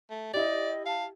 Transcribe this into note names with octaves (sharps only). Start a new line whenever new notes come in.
A3
E4 G4 D5 D#5
F5 A5